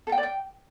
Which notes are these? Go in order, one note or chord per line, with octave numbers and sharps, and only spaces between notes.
A4
G5
D5
G5